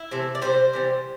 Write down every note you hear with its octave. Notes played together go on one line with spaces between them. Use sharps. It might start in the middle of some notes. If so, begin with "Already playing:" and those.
Already playing: E4
C3 E3 A3
D5
C3 E3 G3 C5
C3 E3 G3